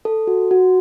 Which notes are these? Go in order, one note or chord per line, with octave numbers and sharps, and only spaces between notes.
A4
F#4
F#4